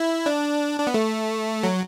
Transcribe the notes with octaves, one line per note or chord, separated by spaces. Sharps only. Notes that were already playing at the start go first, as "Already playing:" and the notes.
Already playing: E4
D4
D4
B3
A3
F#3